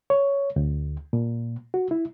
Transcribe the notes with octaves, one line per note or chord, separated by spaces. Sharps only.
C#5
D2
A#2
F#4
E4